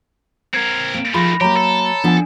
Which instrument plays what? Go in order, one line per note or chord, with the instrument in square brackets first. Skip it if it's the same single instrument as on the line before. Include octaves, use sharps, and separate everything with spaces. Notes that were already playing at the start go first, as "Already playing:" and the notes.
[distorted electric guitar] C4 A#4 [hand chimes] G#6 C7 C#7
[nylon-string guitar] A#3 [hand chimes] D7
[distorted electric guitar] D#3 A3 [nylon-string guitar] F3 F4 G#4 [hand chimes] B5 C6 A#6
[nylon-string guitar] F#3 A#3 [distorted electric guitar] G4 [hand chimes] C#5 A#5 B5
[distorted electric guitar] A4
[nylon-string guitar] F3 B3 [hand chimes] D4 G#5